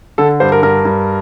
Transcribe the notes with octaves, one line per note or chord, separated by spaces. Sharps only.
D3 A4
G2 C5
A#4
G2 A#4
G2